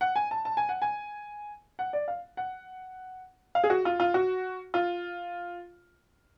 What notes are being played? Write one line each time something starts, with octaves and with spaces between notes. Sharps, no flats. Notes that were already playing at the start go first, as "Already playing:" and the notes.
F#5
G#5
A5
A5
G#5
F#5
G#5
F#5
D5
F5
F#5
F5
G#4
F#4
F4
F4
F#4
F4